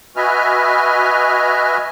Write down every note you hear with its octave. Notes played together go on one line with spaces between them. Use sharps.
F#4 B4 D#5 E5 G#5 F6